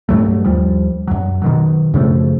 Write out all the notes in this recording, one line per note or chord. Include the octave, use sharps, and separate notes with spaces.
G2 F#3 A3
D#2 F3 G3
F#2 F#3
B2 D#3 F#3
F#2 C#3 F3 A3